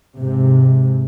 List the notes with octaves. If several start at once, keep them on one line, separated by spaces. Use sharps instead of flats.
G#2 C3